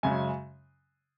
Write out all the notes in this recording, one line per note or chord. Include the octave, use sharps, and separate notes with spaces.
F#2 C#3 G#3 G#5